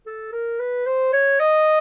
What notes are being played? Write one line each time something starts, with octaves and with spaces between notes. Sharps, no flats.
A4
A#4
B4
C5
C#5
D#5